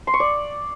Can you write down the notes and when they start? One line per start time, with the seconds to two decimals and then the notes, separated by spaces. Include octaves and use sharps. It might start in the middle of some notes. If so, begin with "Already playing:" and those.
0.07 C6
0.14 C#6
0.20 D5